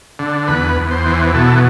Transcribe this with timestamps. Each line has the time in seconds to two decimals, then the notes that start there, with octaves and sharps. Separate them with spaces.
0.19 D3
0.48 E2 B4
0.77 E2
0.91 C5
1.06 E3
1.34 B2 A4